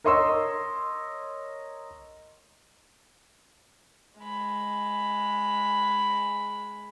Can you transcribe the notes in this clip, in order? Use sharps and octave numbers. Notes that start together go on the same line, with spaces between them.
A#4 C#5 D#5 C6 C#6 E6
G#3 B5